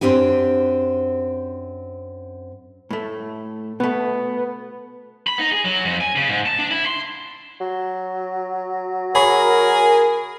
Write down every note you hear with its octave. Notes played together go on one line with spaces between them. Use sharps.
F#2 B2 C4 D4 G4 G#5
A2 A3
B2 A3 B3
B5
D#4
G#4
F#3
F2
G#5
C#3
G#2
A5
D4
E4
C6
F#3
G#4 A#4 C#5 B5 C#6